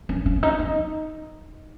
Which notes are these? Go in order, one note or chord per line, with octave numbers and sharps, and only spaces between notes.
C#4
C#4
D#4
D#4